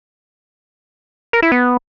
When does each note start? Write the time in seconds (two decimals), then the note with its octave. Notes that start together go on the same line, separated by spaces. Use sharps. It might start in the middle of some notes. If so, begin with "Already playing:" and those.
1.33 A#4
1.42 E4
1.52 B3